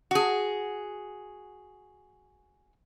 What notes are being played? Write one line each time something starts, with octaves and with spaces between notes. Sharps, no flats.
F#4 G#4